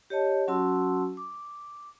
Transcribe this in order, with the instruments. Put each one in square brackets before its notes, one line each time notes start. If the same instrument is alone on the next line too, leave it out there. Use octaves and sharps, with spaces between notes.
[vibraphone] G4 C#5 D#5 A5
F#3 C#4 F#4 A5 C6 E6
D6